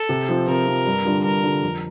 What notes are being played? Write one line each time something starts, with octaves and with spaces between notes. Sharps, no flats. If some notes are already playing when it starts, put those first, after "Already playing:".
Already playing: A4
C3
F3 C4
C3 A#4
F3 C4
G2
D3 G3 D4 F4
G2 A#4
D3 G3 D4 F4
F2